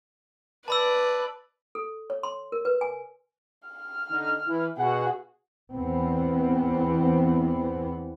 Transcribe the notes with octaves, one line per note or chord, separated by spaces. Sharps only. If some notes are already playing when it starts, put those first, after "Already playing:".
B4 D5 A5 B5 E6
A4
C#5
C6
A#4
B4
G#5
F6
D3 D#4
E3
B2 F#4 G#4 F#5
E2 E3 B3 C4